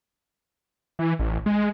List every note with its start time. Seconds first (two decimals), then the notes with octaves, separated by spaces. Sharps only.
0.99 E3
1.19 A1
1.46 G#3